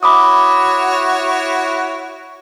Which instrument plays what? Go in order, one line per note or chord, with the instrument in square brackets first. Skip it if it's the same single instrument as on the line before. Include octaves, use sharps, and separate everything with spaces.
[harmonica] E4 F#4 C#5 [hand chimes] B5 D6 D#6